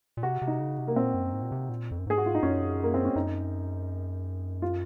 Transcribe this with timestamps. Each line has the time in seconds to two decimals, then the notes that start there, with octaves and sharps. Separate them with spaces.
0.17 A#2
0.23 C3 F#4
0.42 C3
0.47 D#4
0.60 C#3
0.78 C3
0.88 A#3
0.96 A#2 C4
1.14 F#2
1.33 G#2
1.42 A#2
1.52 C3
1.69 A#2
1.91 F2
1.99 F#2
2.07 G#2 G#4
2.18 F#4
2.26 F4
2.35 D#4
2.43 F#2 C#4
2.83 A#3
2.94 C4
3.05 C#4
3.16 F#2 D#4
4.62 F4